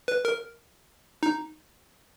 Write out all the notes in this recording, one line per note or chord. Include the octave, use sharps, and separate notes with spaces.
B4
A#4
D#4